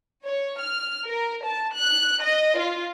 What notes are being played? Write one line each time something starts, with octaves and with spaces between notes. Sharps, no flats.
C#5
F6
A#4
A5
F#6
D#5
F4